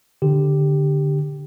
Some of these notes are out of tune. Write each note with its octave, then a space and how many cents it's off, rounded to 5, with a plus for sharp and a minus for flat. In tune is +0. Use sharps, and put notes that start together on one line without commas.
D3 +0 G4 +0